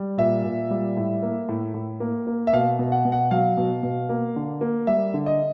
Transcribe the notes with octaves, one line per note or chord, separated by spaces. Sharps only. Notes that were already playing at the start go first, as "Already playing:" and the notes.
Already playing: G3
A#2 E5
A#2
G3
A2
A#3
A2
A2
A#3
A#3
E5
B2 F5
B2
F#5
B2
F#5
F#3 F5
B2
B2
A#3
D3
A#3
G3 E5
D3
D#5